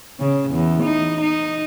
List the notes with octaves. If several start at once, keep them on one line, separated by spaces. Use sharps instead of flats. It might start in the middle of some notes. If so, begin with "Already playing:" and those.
C#3
E2
D#4
D#4